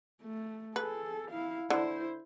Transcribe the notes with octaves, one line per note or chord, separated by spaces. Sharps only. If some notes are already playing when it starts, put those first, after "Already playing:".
A3
G#4 A4 B4
E4 F5
D3 E4 C5